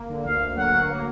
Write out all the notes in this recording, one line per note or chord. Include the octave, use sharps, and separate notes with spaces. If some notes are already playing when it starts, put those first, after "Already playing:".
Already playing: A#3
D3
D2 F5
D2
F#3 F#5
F#3
A#3